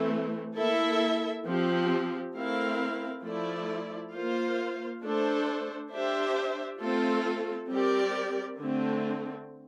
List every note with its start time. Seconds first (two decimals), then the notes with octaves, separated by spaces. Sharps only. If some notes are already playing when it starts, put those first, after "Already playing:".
Already playing: E3 A3 C4
0.56 A#3 E4 A4 E5
1.46 F3 C4 G4
2.35 A3 C4 E4 A#4 F5
3.24 F3 A3 E4 A4 D5
4.14 A#3 F4 C5 F5
5.03 A3 D4 A4 C5
5.91 D4 G4 C5 E5
6.81 A3 C4 F4 A4
7.70 G3 C4 G4 A#4 D5
8.59 D3 A3 C4